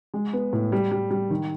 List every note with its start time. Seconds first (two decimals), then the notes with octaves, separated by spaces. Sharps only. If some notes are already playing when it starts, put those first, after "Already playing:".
0.14 G#3
0.33 B3
0.53 A2
0.72 G3
0.91 G3
1.11 G3
1.30 D#3